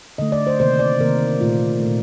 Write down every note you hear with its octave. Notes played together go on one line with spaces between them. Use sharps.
D3 A3 D#5
D5
C5
C3 D#3 A#3 C5
D5
C3 D#3 A#3 A#4
A#2 A3 F4
A3
A#2